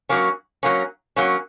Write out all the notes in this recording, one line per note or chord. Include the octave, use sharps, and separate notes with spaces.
F#3 A#3 C#4
F#3 A#3 C#4
F#3 A#3 C#4